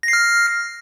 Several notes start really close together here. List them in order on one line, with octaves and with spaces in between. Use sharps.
A#6 C7 F6